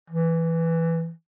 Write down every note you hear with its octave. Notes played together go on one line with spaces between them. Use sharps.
E3